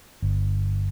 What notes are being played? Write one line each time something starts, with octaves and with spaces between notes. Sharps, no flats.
G1